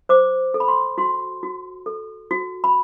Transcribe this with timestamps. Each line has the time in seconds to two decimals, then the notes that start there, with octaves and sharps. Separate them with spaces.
0.09 C5 D6
0.54 A4
0.60 B5
0.68 C6
0.98 F#4 C6
1.43 F#4
1.86 A4
2.31 F#4
2.64 B5